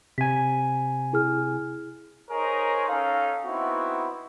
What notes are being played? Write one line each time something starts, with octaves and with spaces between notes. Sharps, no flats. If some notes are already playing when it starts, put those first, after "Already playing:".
C3 G#5 B6
E4 G#4 F6
D#4 G#4 A#4 C5 C#5
C#4 D#4 A4 D#5 F5
B3 C4 D#4 E4 F#4